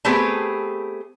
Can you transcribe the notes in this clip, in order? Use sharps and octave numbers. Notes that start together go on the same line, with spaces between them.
A3 B3 C4 G4 G#4 B4